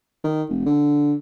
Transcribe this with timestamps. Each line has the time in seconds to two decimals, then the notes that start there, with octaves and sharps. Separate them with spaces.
0.24 D#3
0.49 F1
0.66 D3